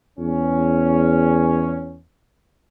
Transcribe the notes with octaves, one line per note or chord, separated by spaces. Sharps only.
E2 C#4